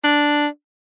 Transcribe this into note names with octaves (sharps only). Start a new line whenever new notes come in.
D4